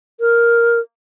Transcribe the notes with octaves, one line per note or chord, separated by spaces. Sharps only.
A#4